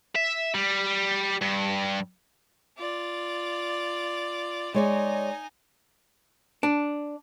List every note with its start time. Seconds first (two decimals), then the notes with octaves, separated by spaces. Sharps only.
0.15 E5
0.54 G3
1.41 G2
2.78 F4 D5
4.74 G#3 D#4 C#5 D5 G#5
6.63 D4